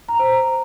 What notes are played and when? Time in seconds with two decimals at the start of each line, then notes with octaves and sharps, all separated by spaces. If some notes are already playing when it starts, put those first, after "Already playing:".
0.09 A#5
0.19 C5